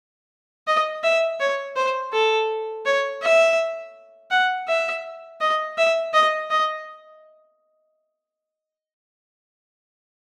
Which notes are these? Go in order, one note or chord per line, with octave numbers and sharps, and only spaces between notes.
D#5
E5
C#5
C5
A4
C#5
E5
F#5
E5
D#5
E5
D#5
D#5